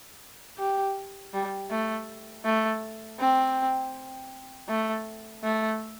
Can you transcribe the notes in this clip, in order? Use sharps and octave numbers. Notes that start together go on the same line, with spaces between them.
G4
G3
A3
A3
C4
A3
A3